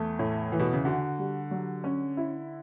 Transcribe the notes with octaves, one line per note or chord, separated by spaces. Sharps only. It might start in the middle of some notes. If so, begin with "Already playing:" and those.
Already playing: E2 A3
A2
E3
B2
C#3
D3 F#4
G3
F#3
C#4
E4